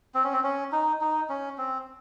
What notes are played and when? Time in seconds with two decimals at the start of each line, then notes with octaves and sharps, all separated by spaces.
0.15 C4
0.24 C#4
0.33 C4
0.44 C#4
0.72 D#4
1.01 D#4
1.29 C#4
1.58 C4